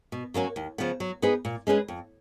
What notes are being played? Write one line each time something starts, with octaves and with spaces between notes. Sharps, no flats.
B2
F#3 A#3 C#4 F#4
D#2
C#3 F3 B3
F#3
B3 D#4 G#4 B4
A#2
G#3 C#4 G#4 B4
F2